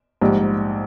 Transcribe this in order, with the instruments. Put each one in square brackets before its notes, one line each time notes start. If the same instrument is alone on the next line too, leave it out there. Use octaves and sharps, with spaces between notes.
[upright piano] A#1 G#2 G3